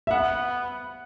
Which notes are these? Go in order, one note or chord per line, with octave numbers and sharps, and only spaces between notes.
E5
B3 F#5